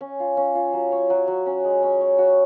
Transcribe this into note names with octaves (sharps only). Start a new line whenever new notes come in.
C#4
F4
C#4
F4
F#3
C#5
F#3
F#3
C#4
G#3
C#4
C#5
F#4